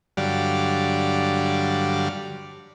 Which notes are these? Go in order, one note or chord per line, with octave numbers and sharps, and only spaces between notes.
G2 D3 F#3 G3 D5 F5